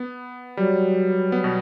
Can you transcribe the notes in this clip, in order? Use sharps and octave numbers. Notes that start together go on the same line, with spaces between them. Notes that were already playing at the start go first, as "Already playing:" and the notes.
Already playing: B3
F#3 G3
B3
B2